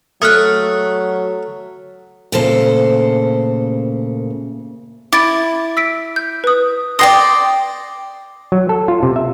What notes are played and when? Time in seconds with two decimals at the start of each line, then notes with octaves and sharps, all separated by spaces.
0.22 F#3 A3 D#6 F6 F#6
2.32 D2 A#2 C#3 A#3 A4 C5
5.13 E4 D6 A6 D7
5.77 E6 B6 D7
6.16 G6
6.44 B4 D#6
6.99 D5 G5 C6 D#6 A#6 C7
8.52 F#3
8.69 A4
8.88 F4
9.03 C3
9.16 E5